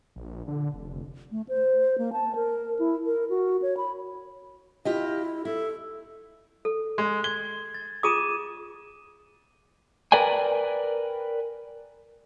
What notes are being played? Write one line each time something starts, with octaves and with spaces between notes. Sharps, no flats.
A#1
D3
F1
A3
C5
A#3
A5
A#4
E4
A#4
F#4
C#5
B5
E4 F4 G4 D#5
E4 A4
A4
G#3
G#6 G7
A6
F4 G#4 D6 D#6 D#7 E7
A#4 B4 D5 G5 G#5